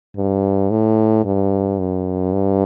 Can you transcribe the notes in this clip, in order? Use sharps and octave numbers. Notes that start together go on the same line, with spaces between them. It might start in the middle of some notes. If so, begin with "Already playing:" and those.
G2
A2
G2
F#2
G2